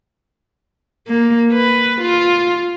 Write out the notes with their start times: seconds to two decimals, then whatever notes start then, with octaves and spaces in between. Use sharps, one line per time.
1.08 A#3
1.53 B4
2.02 F4